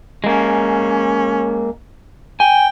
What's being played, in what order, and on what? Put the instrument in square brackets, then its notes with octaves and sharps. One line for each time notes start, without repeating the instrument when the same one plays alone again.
[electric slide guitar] G#3 A#3 [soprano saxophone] C#4
[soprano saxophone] G5 [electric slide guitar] G#5